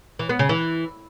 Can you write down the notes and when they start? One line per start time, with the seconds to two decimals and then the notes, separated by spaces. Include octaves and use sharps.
0.19 E3
0.29 B3
0.39 C#3
0.49 E3